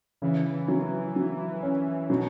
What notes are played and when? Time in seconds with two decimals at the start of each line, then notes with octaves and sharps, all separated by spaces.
0.22 C#3 E3
0.68 F#3
1.16 F#3
1.63 C#4
2.09 B2 F#3